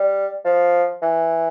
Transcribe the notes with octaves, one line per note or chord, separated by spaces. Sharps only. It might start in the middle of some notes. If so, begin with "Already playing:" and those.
Already playing: G3
F3
E3